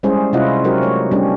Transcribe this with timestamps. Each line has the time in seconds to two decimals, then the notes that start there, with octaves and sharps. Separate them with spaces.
0.03 G3 G#3 C#4 E4 G#4 C5
0.33 C3 C#4 E4 F4 D#5 F#5
0.64 F#3 D#4 F#4 G4 A#4 C5
0.83 A3 C#5
1.11 G3 B3 C#4 D4 G4